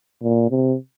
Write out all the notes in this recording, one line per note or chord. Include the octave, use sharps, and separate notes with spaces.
A#2
C3